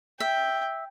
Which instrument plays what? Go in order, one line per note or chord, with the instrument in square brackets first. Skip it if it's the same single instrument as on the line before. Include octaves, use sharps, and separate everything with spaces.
[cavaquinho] E5 [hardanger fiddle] G5